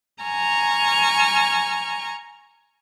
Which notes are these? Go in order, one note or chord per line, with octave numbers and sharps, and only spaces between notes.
G#5 A#5 C#6 F6